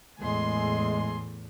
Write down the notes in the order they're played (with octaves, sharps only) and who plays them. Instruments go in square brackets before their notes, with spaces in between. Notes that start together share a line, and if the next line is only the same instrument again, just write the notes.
[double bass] E2 A2 [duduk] G#3 [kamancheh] G#4 C6